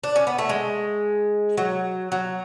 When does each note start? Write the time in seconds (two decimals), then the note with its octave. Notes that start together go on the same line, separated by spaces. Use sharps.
0.04 D4
0.16 C#4
0.27 B3
0.38 A3
0.49 G#3
1.58 F#3
2.12 F#3